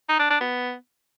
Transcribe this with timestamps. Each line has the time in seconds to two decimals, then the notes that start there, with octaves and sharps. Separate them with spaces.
0.09 D#4
0.19 D4
0.30 D4
0.41 B3